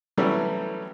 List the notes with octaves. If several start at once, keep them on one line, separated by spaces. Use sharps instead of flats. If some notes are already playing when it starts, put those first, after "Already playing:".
E3 F#3 G3 A3 C#4